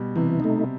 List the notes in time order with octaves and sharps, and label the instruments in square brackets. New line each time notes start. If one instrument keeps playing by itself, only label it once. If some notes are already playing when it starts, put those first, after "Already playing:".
Already playing: [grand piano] B2 G3
[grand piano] C3 [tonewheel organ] E3
[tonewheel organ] A3 D#4